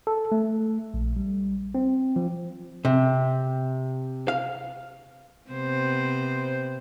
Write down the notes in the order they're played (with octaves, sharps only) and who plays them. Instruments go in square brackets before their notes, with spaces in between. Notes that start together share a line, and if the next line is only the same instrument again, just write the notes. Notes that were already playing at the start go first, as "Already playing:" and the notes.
[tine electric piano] A4
A3
A#1
G3
C4
F3
[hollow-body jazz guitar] C3
F5
[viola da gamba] C3 B3 C5